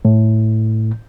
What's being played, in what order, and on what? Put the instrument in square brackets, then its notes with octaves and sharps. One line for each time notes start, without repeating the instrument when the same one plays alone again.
[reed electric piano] A2